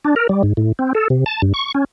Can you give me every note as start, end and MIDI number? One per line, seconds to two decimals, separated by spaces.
0.05 0.15 62
0.16 0.27 70
0.29 0.42 55
0.43 0.53 44
0.57 0.72 45
0.79 0.93 60
0.95 1.08 69
1.10 1.24 48
1.26 1.42 81
1.42 1.53 43
1.54 1.72 85
1.75 1.84 61